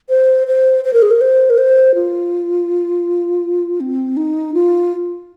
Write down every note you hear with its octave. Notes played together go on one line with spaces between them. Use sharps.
C5
C5
C5
A#4
G#4
A#4
C5
A#4
C5
F4
C4
D#4
F4